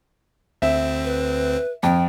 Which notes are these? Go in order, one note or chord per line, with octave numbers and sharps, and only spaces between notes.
D2 C4 E5
B4
F2 G5